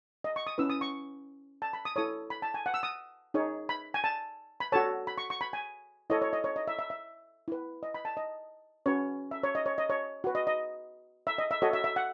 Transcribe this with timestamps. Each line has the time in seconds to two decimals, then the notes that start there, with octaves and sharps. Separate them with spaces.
0.24 D#5
0.36 C#6
0.47 D#6
0.58 C#4 E4 B4 E6
0.70 D#6
0.81 C#6
1.62 A5
1.73 B5
1.85 D#6
1.96 E4 A4 C#5 D#6
2.30 B5
2.42 A5
2.54 G#5
2.66 F#5
2.74 E6
2.83 D#6
3.34 D#4 G#4 C#5
3.69 B5
3.94 G#5
4.04 A5
4.60 B5
4.72 F#4 A4 C#5 A5
5.07 B5
5.18 C#6
5.30 C#6
5.41 B5
5.53 G#5
6.10 E4 A4 C#5 D#5
6.22 C#5
6.33 D#5
6.44 C#5
6.56 D#5
6.68 E5
6.79 E5
6.90 E5
7.48 E4 B4
7.83 D#5
7.94 B5
8.05 A5
8.17 D#5
8.86 C#4 F#4 B4 C#5
9.31 E5
9.43 C#5
9.55 D#5
9.66 C#5
9.78 D#5
9.90 C#5
10.24 F#4 B4
10.35 D#5
10.47 D#5
11.27 E5
11.38 D#5
11.51 E5
11.62 F#4 A4 C#5 D#5
11.73 E5
11.84 E5
11.96 F#5